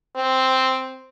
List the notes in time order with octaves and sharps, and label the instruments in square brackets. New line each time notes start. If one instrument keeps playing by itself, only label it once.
[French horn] C4